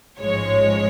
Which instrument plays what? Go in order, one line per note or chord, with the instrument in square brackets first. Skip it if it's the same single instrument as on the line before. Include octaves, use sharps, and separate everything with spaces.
[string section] A1 G#2 F3 G#3 C#5